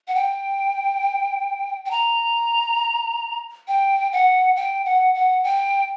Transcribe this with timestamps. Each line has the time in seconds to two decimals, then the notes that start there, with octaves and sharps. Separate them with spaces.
0.08 F#5
0.15 G5
1.86 G5
1.91 A#5
3.68 G5
4.12 F#5
4.56 G5
4.85 F#5
5.15 F#5
5.44 G5